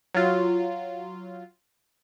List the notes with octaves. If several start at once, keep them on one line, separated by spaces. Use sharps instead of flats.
F#3 F4